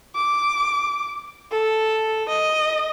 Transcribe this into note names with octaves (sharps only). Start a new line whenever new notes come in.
D6
A4
D#5